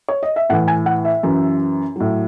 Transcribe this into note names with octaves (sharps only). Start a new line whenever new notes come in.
C#5
D#5
E5
A2 E3 F#5
G#5
F#5
E5
F#2 E3
A2 F#3